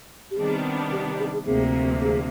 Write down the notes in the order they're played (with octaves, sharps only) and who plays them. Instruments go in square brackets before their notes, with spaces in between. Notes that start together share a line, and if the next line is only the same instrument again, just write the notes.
[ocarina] G4
[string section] C3 D#3 G3 B3 D4 [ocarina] G#4
[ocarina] G4
G#4
G#4
[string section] D2 C3 F3 A#3 [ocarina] G#4
[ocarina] G#4